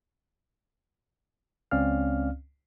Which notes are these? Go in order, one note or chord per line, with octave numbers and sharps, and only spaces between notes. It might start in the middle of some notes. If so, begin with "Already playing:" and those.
C#2 C4 C#4 D5 F5 F6